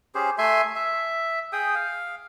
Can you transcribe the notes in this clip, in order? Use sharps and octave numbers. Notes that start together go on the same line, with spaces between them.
C#4 G4 G#4 C5
A3 E5 G#5 C6
E5
G#4 G5 D#6
F5